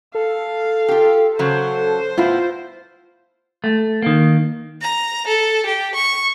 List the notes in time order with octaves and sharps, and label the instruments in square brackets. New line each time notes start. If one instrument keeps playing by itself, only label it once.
[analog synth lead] A4 [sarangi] F5
[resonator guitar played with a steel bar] F4 G4
[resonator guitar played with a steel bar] C#3 F#3 [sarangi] C5
[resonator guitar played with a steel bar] A2 B3 E4 [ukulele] F4
[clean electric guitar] A3
D#3 A#3
[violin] A#5
A4
G4
C#6